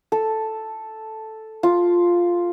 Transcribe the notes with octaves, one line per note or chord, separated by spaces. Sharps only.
A4
F4